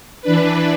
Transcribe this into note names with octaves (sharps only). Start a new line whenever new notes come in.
E3 D4 B4